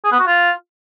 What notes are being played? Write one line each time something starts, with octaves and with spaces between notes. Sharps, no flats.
G#4
B3
F#4
F4